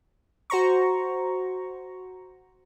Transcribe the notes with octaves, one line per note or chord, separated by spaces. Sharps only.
F#4 C5 A#5 C#6